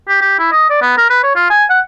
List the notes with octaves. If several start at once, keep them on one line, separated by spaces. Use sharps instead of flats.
G4
G4
E4
D#5
D5
B3
A#4
B4
C#5
F4
G#5
F#5